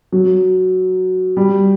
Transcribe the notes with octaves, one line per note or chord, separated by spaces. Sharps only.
F#3
G3